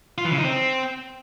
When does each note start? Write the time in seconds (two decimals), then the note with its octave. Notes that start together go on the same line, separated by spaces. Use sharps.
0.18 F4
0.25 E3
0.31 C#3
0.38 D#4
0.45 C4